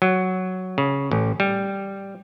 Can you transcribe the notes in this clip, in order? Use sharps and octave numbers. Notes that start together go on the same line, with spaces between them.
F#3
C#3
A1
G3